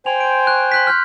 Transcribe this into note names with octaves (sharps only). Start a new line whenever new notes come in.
C5 G5 G#5 C6 F7
C6 D7
C#6 F#6
C6 F#6 B6
F6 G6